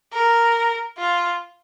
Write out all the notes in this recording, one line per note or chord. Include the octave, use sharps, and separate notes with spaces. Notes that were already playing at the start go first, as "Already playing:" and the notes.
A#4
F4